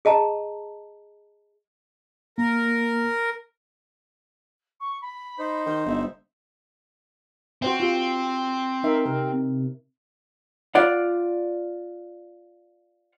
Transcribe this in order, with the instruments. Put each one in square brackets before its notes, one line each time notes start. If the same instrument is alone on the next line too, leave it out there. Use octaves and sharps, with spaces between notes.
[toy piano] G#4 D#5 A5 A#5
[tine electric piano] A#3 [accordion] A#4
[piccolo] C#6
B5
[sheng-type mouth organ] D#4 C5
[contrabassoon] D#3 [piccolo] G6
[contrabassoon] G1 [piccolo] E5
[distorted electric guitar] C4 [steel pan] F#4 C5 E5
[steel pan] F4 G4
[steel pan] D#4 E5 [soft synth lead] A#4
[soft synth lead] C3 [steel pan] A#4
[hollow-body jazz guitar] F4 D5 F#5